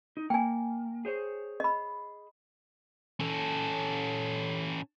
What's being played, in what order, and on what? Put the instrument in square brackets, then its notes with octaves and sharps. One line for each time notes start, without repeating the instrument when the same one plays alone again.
[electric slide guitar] D#4
[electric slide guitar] A#3 [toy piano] G5 G#5
[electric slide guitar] G#4 C5 C#5
[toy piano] D#5 B5
[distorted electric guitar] C#4 A4